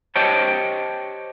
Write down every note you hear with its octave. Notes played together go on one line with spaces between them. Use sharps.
G4 C5 C#5 D#5 G5 A5